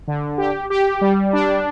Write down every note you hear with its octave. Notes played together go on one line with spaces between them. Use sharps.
D3
G4
G4
G3
D4